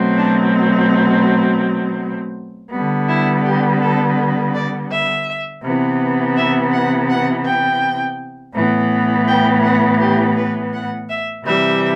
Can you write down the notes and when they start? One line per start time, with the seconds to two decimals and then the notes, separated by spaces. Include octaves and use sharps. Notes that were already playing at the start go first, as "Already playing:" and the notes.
Already playing: B2 F#3 A3 C4
0.17 D4
2.72 D3 G3 B3
3.08 E4
3.45 G4
3.81 A4
4.54 D5
4.90 E5
5.63 C3 E3 B3
6.36 E5
6.72 F#5
7.09 F#5
7.45 G5
8.54 A2 E3 B3
9.27 G5
9.63 F#5
10.00 G4
10.36 B4
10.73 F#5
11.09 E5
11.45 C3 E3 G3 E5